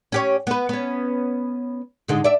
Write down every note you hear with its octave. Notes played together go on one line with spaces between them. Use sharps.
C#4 G4 C#5
B3 B4
B3 C#4
G#2 D3 G#3
D5 E5